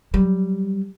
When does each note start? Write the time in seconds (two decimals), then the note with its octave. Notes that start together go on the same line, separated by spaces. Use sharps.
0.14 F#3 G3